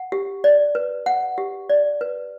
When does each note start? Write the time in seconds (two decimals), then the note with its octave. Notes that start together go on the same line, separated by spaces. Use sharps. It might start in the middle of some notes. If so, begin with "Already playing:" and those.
Already playing: F#5
0.12 G4
0.44 D5
0.75 B4
1.06 F#5
1.38 G4
1.70 D5
2.01 B4